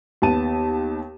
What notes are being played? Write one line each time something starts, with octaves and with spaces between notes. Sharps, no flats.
D#2 B3 A5 D#7